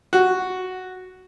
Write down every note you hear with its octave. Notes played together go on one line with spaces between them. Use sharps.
F#4